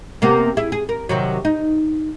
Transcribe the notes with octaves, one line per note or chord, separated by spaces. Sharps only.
C3 A#3 B3
E4 G#4
G#4
A#4
C3 D#3 F#3
D#4